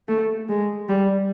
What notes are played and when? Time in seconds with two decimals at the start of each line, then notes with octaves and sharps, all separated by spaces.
0.09 A3
0.49 G#3
0.89 G3